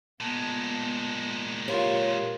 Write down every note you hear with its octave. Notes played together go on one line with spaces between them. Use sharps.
A#2 G#3 B3 A5
F4 G4 A#4 C#5